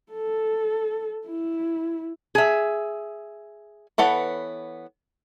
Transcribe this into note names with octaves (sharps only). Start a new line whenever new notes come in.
A4
E4
G#4 E5
E3 B3 A4 C#5 F#5